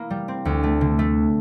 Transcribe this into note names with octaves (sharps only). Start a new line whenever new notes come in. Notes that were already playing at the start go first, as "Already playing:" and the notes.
Already playing: A#3 E4
G3
C4
D2
A3
D3
A3